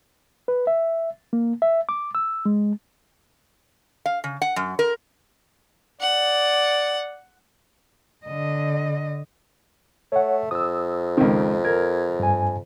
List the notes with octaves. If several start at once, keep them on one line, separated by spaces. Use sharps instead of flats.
B4
E5
A#3
E5
D6
E6
G#3
F5
C#3
F#5
F#2
A#4
D5 F#5
D3 D#5
A3 C#5 F#5
F2 D#6 E6
C#2 D#3
A#4 G#6
G2 G#5